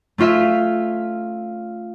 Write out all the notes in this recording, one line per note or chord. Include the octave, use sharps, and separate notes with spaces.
A3 C#4 F4 E5 F5